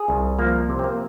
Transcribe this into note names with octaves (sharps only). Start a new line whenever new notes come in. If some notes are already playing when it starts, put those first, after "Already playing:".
Already playing: G#4
C2
F3 A#3
C3
C4
A#3